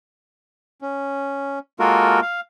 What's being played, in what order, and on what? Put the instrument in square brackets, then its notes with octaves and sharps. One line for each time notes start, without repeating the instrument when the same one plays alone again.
[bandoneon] C#4
G#3 A#3 F4 F#4 A4 A#4
F5